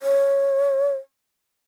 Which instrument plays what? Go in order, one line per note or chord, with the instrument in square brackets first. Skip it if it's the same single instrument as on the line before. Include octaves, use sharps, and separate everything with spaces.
[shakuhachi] C#5